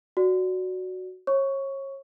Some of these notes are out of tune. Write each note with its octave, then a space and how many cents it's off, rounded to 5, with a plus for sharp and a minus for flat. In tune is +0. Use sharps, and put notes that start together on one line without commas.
F#4 +0 D5 +0
C#5 -30 C#6 +10